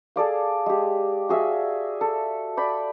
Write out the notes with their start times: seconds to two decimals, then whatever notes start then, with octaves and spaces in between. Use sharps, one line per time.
0.16 G#4 A4 D5 F5
0.66 G#3 G4
1.29 F#4 G#4 E5 F5
2.01 A4
2.57 D5 G5 B5